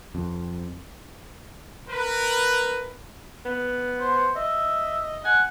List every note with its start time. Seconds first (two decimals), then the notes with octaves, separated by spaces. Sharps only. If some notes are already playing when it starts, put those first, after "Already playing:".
0.15 F2
1.89 A#4 B4
3.45 B3
4.00 C5
4.36 D#5 E5
5.25 F#5 G#5